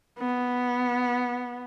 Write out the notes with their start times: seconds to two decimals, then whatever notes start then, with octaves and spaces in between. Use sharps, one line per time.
0.19 B3